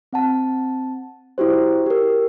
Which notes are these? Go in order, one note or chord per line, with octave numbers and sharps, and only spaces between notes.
C4 F#5 A5
E4 F#4 G4 C5
G4 A#4